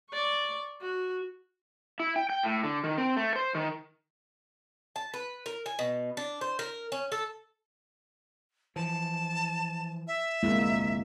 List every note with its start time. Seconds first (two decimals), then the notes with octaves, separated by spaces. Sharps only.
0.12 D5 C#6
0.82 F#4
2.00 E4
2.16 G5
2.30 G5
2.43 A2
2.63 D3
2.84 D#3
2.98 C4
3.16 A3
3.36 C5
3.55 D#3
4.96 A5
5.13 B4
5.46 A#4
5.66 G#5
5.79 B2
6.17 D4
6.41 C5
6.59 A#4
6.92 C#4
7.12 A4
8.76 E3 F3 A5
10.07 E5
10.43 G1 C2 F2 G#3 A#3 E4